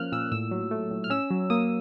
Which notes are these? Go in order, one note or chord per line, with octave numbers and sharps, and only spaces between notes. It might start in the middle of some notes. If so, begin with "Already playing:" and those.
Already playing: F3 A#3 C#4 F6 F#6
A#2 E6
A2 E6
F#3
A3
A2
F6
C#4 E6
F#3
A#3 D#6